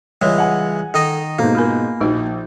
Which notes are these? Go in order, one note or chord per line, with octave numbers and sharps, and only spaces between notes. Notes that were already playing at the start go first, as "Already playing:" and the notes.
C#2 E3 G3 G#3 C#5
F#5 G#5
D#3 D#4 A4 D#5
G#2 B2 A#3 A4 C5 A#5
F4 A#4 G#5 B5 F6
A#1 F3 D#4 F#4